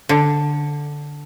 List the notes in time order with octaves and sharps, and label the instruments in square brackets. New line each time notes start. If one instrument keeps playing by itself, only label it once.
[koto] D3